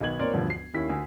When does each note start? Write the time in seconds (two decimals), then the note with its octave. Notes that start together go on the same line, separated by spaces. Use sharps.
0.01 B1 D#3 B3 F#4 G#6 F#7
0.19 A#2 C4 A#4 C#5 D5 C6
0.33 E1 D2 G2 F3 B3
0.50 C7
0.74 D#2 C#4 E4 B6
0.89 D2 G#5